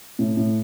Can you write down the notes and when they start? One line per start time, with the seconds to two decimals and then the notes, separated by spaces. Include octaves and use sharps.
0.19 A2
0.37 A2